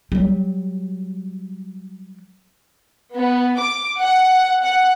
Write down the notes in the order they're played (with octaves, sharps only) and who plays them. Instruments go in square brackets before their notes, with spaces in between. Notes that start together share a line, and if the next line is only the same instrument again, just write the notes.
[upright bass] F#3 G3
[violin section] B3
D6
F#5
F#5